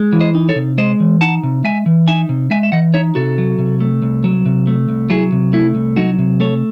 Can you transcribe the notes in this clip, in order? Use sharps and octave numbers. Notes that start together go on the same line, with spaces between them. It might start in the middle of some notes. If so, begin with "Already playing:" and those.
Already playing: G#3
E3
C5 D#5
D#4
A4 C#5
C3
G#3 C5 D#5
E3
D#4 F#5 A5
C3
G#3 E5 G#5
E3
D#4 E5 G#5
C3
G#3 E5 G#5
E5
E3 D#5 F#5
D#4 C#5 E5
C3 F#4 A4
F#3
C3
A3
C2
F#3
C3
A3
C2
F#3 E4 G#4
C3
A3 E4
C2
F#3 D#4 F#4
C3
A3 A4 C#5